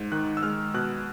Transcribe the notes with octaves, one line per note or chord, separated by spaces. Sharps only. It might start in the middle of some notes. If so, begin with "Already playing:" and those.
Already playing: G#2
D#3 F#6
E6
G#3 F6
B2 F#6